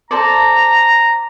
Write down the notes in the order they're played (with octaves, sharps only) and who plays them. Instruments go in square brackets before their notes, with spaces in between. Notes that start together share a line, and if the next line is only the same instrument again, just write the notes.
[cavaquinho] A4 C5 D5 [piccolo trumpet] A#5